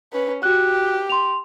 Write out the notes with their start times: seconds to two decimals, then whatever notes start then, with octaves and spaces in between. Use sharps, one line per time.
0.13 C#4 B4
0.43 F#4 G4 F#6
1.09 C6 F7